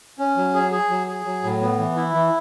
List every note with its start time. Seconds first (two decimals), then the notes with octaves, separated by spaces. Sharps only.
0.18 C#4
0.36 F#3
0.54 G#4
0.72 G#4
0.89 F#3
1.07 G#4
1.25 F#3
1.43 A2
1.61 B3
1.78 E3
1.96 E4
2.14 E3